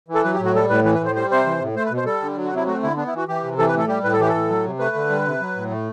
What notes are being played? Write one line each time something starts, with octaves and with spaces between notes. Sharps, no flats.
E3
A4
F#3 B4
G4
A2
F#4
G3 A4
A2 B4
E3 B4
B4
A2 C5
G3 C5
C3 C5
E3
A2
A3 C5
B4
B2
C5
G3 A4
D3
F#3
F#4
C3 E4
A3 F#4
D3 E4
B3 D4
E4
E3 F#4
E3 G4
C3
E3 A4
B4
A2
A4
G3 G4
A2 B4
A4
E3 G4
A4
A2
F#3
C3
A3 B4
D3
G3
C3
F#3
A2
A3